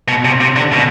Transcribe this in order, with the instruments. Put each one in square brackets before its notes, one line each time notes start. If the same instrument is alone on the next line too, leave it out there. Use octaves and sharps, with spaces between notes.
[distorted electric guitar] B2
C3
C3
D3
B2